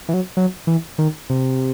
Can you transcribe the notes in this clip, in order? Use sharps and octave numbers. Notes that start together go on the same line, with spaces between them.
E3
F#3
F#3
E3
D#3
C3